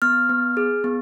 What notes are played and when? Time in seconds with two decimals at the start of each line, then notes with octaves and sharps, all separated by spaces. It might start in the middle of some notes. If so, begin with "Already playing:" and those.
0.02 B3 F6
0.29 B3
0.57 G#4
0.84 B3